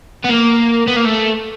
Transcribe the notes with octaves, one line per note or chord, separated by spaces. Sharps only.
B3
A#3
B3
A#3
A3